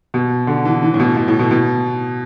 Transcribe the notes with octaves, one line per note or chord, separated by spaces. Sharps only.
B2
D3
E3
E3
A2
B2
B2
A2
B2
B2